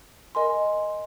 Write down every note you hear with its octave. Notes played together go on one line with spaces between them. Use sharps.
A#4 D#5 G#5 C6